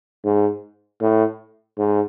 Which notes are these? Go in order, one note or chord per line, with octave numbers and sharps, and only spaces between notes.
G#2
A2
G#2